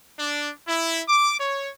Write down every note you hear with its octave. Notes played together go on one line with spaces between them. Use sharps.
D4
E4
D6
C#5